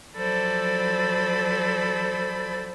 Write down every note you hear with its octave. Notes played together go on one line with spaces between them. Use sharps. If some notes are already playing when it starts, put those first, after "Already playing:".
F3 F#3 A4 C5 D5 B5